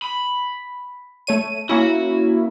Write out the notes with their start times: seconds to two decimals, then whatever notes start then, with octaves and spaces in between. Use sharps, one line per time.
0.02 B5
1.27 A3 C#5 D#7
1.69 A#3 C#4 E4 F#4